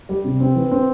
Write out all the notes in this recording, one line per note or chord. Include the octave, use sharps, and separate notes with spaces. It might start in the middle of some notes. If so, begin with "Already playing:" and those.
G3
C3
C4
E3
C4